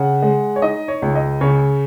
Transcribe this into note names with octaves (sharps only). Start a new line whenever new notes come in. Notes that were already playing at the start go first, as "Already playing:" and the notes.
Already playing: C#3 F#5
G#3
C#5
D#4 D#5
C#5
C#2
D#5
C#3 C#5